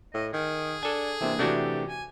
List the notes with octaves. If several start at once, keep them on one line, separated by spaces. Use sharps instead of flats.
A2 D#5
D#3 G#4
D4 A4 G#5
C3 E3 A#3 D4
C3 E3 A3 D4 F#4 G4
G#5